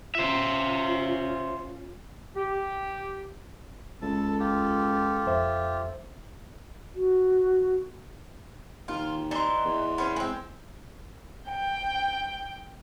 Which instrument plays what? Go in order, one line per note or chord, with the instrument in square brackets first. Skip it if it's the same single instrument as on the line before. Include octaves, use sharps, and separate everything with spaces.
[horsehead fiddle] C#4 F4 [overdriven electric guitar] C5 E5
[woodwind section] G4
[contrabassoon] C#2 [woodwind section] A4 [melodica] A5
[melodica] F4 G4
[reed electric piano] F2 C5 E5
[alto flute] F#4
[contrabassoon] D#2 [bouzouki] F4
[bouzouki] E3 D#4 [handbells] D5 C6
[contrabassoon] E2
[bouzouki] B3 C#4 C5
G#3 C4
[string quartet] G5